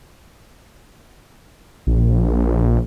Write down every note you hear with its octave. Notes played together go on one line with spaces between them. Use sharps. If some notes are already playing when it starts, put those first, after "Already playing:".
A#1